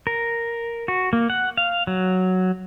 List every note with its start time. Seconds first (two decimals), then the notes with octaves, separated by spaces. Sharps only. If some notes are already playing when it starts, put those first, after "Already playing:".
0.07 A#4
0.88 F#4
1.13 A#3
1.30 F#5
1.57 F5
1.87 F#3